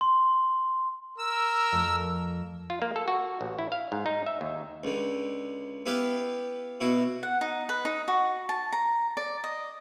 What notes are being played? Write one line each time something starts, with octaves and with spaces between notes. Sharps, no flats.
C6
A#4 E6
F2 A3
F4
A#3
A4
F#4
A1
E4
F5
G#2
D#4
E5
D#2
C#2 D3
B3 E4 G4 B4 F5
B2 E4 F#4
F#5
D#4
B4
D#4
F#4
A5
A#5
D5
D#5